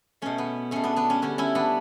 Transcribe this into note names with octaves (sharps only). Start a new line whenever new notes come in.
B2 A3 C#4
B3
B2 A3 C#4
B3 D4
B3 D4
C#4
D3 G3 C#4
C#4 E4
B3 D4